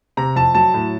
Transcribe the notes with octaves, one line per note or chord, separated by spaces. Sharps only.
C3 A#5
F2 A5
F#3 A5
A2